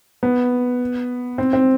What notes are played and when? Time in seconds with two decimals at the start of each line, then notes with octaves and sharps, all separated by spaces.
0.23 B3
1.38 C4
1.53 C4